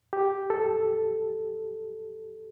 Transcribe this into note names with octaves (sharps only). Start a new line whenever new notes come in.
G4
A4